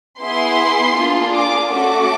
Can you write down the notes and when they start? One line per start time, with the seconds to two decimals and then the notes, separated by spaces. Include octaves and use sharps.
0.21 B3 E4 G#4 C6
0.97 A#3 D4 F4 G#4
1.35 D6
1.71 A3 C#4 F#4 A4 D6